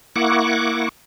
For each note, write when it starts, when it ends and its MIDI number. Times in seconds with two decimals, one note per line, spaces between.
0.16 0.89 58
0.16 0.89 64
0.16 0.89 78
0.16 0.89 85
0.16 0.89 86